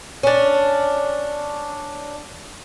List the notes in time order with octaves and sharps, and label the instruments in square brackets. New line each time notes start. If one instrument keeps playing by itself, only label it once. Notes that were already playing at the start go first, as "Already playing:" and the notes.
[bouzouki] C#4 D4